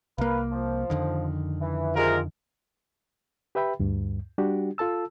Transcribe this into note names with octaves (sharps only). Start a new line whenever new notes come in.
C2 A#3 A#4 B4 F5
F3
F2 D3 D#3
E3
C3 G#3 F4 A#4
G4 B4 E5 G5 B5
D2 G2
G3 D4 F#4 G4
F4 A4 A5 E6